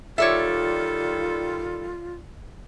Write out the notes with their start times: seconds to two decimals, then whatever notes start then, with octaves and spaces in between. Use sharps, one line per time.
0.18 D#3 G3 F4 A4 C#5 D5 E5